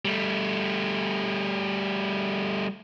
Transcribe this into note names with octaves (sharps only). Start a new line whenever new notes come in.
G3 A3